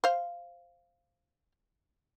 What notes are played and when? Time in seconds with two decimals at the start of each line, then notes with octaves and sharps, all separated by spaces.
0.04 C5 F5